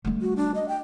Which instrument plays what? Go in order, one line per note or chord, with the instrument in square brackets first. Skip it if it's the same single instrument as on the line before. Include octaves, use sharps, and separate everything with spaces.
[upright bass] G3 A3
[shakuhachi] F#4
D4
D#5
G5